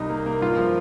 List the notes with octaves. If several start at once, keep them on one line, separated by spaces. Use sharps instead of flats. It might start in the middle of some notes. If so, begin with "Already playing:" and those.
Already playing: C2 C3 D#4
A#3
A#3
G2 F4
F3